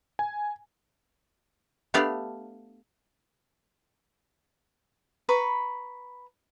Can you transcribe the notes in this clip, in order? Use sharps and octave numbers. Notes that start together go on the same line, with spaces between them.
G#5
A3 B3 D4 G4 D5 F5
B4 A#5 B5 C#6